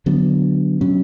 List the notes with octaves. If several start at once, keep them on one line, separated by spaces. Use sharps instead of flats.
D3 F#3 B3 D4
B2 F#3 C#4